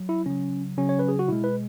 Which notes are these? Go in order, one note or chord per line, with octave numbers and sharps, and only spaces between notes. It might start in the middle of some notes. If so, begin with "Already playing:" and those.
Already playing: F#3
E4
C#3 F#3 C#4
C#3 F#3 C#4
C#5
B4
G#4
F#4
B2 G#3 E4
B4